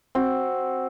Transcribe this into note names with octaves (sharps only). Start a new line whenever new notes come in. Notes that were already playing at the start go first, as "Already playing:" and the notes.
C4 F#4